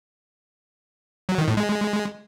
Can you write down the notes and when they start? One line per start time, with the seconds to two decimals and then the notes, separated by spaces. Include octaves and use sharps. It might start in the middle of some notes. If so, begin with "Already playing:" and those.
1.29 F#3
1.38 D#3
1.48 A2
1.57 G#3